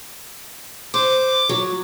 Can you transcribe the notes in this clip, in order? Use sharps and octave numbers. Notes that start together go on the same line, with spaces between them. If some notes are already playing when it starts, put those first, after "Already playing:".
C5 D6
F#3